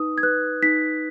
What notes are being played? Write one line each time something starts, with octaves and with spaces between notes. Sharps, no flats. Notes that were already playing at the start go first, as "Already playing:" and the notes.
Already playing: D#4 B4 D#6
G#6
B4 F#6
D#4 B6